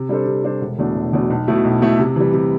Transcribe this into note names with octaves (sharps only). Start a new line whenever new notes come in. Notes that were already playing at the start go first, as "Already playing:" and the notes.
Already playing: C3
G3 D4 A4 C5
C3
G3 D4 A4 C5
E1
E2 B2 A3 D4
E1
E2 B2 A3 D4
B1
B2 A3 E4
B1
B2 A3 E4
C3
E3 G3
C3